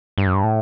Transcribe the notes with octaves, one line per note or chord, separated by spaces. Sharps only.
G2
F#2
G2
A2